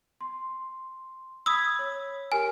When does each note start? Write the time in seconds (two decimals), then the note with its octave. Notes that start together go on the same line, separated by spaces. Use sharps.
0.21 C6
1.46 B5 D#6 E6 G#6 B6
1.79 C#5
2.32 G4 A#4 G#5 F6